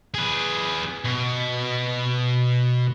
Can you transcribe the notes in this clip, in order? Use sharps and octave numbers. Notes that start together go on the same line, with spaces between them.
G#4 B4
B2